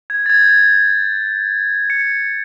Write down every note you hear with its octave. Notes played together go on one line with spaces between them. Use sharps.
G#6
A6
G#6
G6
G#6
C#7